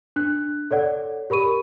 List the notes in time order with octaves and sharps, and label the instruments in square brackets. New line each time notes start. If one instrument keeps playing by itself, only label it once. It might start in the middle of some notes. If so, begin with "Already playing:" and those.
[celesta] D4 F#6
A4 C#5 D5 F#5
G4 A#4 B5 C#6 D#7